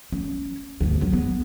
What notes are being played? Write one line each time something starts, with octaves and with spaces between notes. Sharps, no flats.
C#4
D2 G2
C#3 F#3
B3